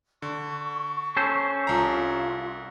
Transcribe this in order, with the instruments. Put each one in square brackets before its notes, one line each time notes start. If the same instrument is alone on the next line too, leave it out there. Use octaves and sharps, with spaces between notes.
[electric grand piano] D3 [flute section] C#6
[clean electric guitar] C#4 A4 C5
[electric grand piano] C2 A#5 [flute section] F4